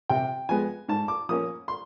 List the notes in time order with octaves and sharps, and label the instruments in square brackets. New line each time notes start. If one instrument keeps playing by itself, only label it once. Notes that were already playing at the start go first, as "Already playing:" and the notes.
[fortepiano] C3 G5
F3 G#3 B3 G#5
G#2 A5
D6
F3 A#3 C#4 D#6
C6